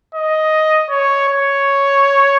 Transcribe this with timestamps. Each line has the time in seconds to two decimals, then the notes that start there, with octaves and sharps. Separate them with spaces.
0.15 D#5
0.90 C#5
1.28 C#5